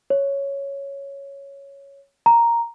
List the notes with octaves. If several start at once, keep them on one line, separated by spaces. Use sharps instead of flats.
C#5
A#5